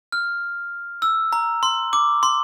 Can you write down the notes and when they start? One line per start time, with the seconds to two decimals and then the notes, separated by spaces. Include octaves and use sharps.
0.12 F6
1.02 E6
1.32 A#5
1.63 C6
1.93 D6
2.23 C6